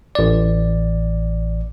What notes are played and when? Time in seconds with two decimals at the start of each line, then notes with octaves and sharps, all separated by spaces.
0.15 A1 D5